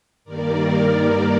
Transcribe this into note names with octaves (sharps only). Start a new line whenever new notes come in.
G2 D#3 G3 A#3 A#4 D5